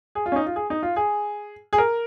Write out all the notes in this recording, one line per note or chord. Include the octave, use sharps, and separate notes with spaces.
G#4
F4
C#4
D#4
F4
G#4
D#4
F4
G#4
G#4
A#4